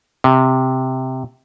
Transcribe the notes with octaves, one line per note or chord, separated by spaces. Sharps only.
C3